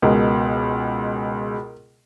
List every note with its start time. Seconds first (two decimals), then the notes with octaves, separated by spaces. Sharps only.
0.02 C#2 B2 G#3 A#4